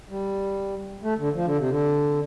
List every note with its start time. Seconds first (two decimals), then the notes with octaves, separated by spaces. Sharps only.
0.10 G3
1.03 A3
1.18 D3
1.34 F3
1.45 D3
1.58 C3
1.69 D3